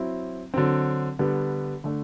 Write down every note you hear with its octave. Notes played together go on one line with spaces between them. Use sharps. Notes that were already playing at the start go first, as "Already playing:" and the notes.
Already playing: F#3 C4 E4
D3 F#3 C4
D3 G3 B3
D3 A3 D4